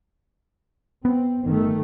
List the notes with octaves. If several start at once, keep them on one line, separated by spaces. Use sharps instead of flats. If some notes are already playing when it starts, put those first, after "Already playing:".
B3 C4
G1 D#3 A3